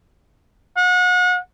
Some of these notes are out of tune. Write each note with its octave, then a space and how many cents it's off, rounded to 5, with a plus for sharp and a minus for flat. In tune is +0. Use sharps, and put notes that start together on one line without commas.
F#5 -35